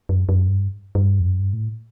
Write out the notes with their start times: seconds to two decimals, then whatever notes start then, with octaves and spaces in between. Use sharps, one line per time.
0.09 F#2
0.29 F#2
0.48 G2
0.95 G2
1.20 E2
1.24 F#2
1.39 G2
1.53 A2